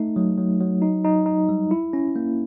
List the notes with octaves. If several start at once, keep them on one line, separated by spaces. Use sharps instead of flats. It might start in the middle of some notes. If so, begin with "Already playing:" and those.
Already playing: A3 D#4
F#3
F#3
F#3
D#4
D#4
D#4
G3
E4
C#4
A#3